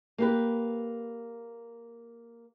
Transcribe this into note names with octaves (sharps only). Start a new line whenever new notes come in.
A#3 G4 B4